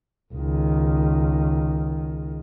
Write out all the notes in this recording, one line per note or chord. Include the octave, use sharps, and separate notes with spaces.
C#2 D#3